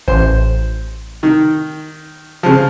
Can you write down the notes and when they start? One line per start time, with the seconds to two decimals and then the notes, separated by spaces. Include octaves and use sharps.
0.08 A1 C5
1.23 D#3
2.43 C#3 F3